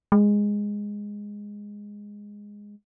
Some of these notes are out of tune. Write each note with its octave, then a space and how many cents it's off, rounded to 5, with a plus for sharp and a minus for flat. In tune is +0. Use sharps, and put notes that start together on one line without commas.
G#3 -10